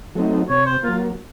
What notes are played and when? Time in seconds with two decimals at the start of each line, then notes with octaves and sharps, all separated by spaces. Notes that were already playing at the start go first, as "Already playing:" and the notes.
0.15 F#3 A3 C4 D#4
0.49 C3 C#5
0.66 C5
0.83 F#3 A#3 F4